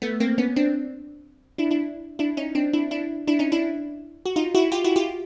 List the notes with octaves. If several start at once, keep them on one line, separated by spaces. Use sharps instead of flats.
A3 B3
A#3 C4
B3 C#4
C4 D4
D4 E4
D4 E4
D4 E4
C#4 D#4
C4 D4
D4 E4
D4 E4
D4 E4
C#4 D#4
D4 E4
F#4
D#4 F4
E4 F#4
F4 G4
E4 F#4
F4 G4